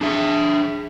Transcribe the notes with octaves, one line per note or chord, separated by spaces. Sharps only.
D4 G#4 E5